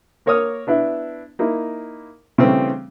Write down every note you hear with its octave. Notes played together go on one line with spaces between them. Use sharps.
A#3 A#4 C#5 C#6 D#6 F6
B3 D4 E4 E5
A#3 D#4 E4
C#3 E3 G3 A3 C4 D4